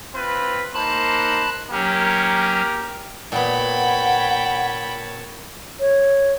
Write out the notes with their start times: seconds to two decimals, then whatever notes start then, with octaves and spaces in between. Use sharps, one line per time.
0.14 C4 F4 B4
0.74 A#3 D#4 C5 A5 B5 F#6
1.71 F#3 A#3 C#4 G4 A#4
3.32 A#2 B3 C#5 F#5 G5 A5 B5
5.80 C#5